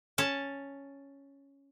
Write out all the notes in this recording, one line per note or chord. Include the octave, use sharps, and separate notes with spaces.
C#4 A5